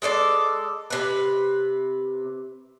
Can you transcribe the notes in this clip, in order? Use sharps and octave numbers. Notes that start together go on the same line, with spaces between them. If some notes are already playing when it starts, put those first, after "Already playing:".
G#3 A4 C#5 D5
C3 B4